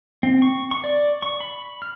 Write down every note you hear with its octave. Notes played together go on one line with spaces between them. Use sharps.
C4
C#6
C#6
D5
C#6
B5
F6